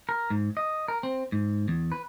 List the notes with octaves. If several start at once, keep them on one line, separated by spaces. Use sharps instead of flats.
A#4
G#2
D#5
A#4
C4
G#2
E2
B4